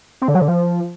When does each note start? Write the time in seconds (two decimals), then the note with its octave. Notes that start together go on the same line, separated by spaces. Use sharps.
0.22 C4
0.28 D3
0.35 F#3
0.42 D3
0.48 F3